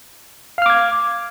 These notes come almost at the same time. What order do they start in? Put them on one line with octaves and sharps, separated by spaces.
F5 F6 D6 G#6